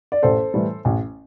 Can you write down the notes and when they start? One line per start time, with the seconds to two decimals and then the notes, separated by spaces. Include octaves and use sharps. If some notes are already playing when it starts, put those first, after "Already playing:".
0.12 D5
0.23 A1 A4 C5
0.54 A2 E3 G3
0.85 A1